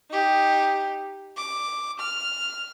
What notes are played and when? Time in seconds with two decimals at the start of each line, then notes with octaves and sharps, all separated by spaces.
0.10 D#4 G4
1.37 D6
2.00 F6